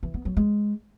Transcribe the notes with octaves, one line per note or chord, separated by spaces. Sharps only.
E3
B3
F#3
G#3